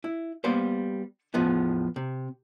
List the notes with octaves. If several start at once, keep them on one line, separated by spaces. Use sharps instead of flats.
E4
G3 A#3 B3 B4 C5
E2 A2 F3 G#3 B3 D#4
C3